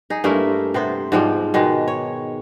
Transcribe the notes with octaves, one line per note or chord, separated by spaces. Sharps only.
D#4 G#4
G2 A3 A#3 E4
C3 B3 C5
G#2 F3 G3
B2 D#3 G#3
C#5